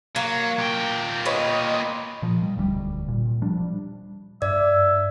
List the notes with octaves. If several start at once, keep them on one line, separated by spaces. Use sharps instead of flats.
F#3 A#3
A#2 G5
B4 C#5 D#5
A#2 F3
G3
E1 D2 F#3 G3
A#2
F3 G3 D4
G2 D5 E5